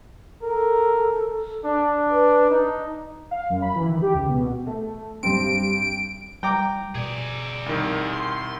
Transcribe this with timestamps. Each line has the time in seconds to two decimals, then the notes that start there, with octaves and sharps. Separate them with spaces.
0.42 A4 A#4
1.65 D4
2.11 B4
2.50 D#4
3.31 F5
3.50 F#2
3.62 B5
3.76 E3
3.88 D#3
4.02 G4
4.14 C#2
4.29 B2
4.67 A3
5.23 G2 C4 D7
6.43 G3 G5 A#5 D6
6.95 B2 G#4 D5
7.66 C2 D#3
8.13 C6